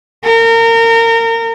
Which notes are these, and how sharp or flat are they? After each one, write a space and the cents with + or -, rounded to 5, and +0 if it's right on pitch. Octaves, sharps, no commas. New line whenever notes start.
A#4 -30